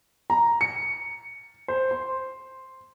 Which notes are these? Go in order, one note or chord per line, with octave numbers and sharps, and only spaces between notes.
A#5
C#7
C5
C6